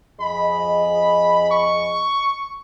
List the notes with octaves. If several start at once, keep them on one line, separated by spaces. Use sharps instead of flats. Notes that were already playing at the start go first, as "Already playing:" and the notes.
F2 G#4 D#5 B5
C#6